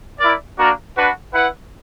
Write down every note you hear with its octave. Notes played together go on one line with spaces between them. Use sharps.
E4 A#4 D5
A#3 D4 F#4 A#4 D5
D4 F#4 B4
E4 B4 F#5